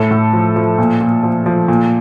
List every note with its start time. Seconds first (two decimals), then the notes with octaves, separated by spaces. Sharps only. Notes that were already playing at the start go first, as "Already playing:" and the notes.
Already playing: A2 A4
0.11 A2
0.33 F3
0.56 F3
0.78 A#2
1.01 A#2
1.23 F3
1.46 F3
1.68 A#2